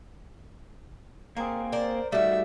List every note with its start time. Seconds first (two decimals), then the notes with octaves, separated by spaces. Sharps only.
1.37 A#3 C4 G#4 A#4
1.72 A#4 C5 D5
2.12 D#3 G3 A3 F#4 E5